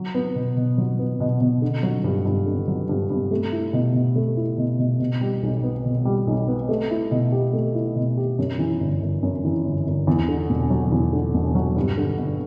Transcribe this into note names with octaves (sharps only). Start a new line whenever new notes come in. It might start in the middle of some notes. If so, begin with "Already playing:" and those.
Already playing: F#3
B3
B2
B2
F#3
B3
B2
B2
D3
F#3
G2
G2
D3
F#3
G2
G2
A3
E4
B2
B2
A3
E4
B2
B2
B2
G3
B1
B3
B2
G3
B1
B3
A3
E4
B2
G4
A3
E4
B2
G4
F#2
E3
G1
G1
F#2
E3
G1
G1
E2
D3
E1
F#3
E2
D3
E1
F#3
G2
D3
G1